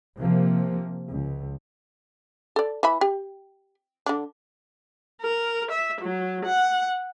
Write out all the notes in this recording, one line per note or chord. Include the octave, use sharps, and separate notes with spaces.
C3 F3 A#3
C#2
A4 D5
E3 E5 B5
G4
D3 D4
A#4
E5
F#3
F#5